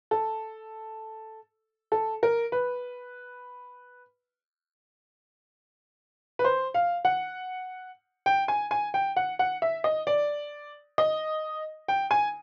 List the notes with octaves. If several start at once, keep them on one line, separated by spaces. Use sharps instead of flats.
A4
A4
A#4
B4
B4
C5
F5
F#5
G5
G#5
G#5
G5
F#5
F#5
E5
D#5
D5
D#5
G5
G#5